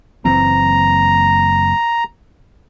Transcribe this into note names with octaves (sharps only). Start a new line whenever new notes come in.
F#1 E3 C4 A#5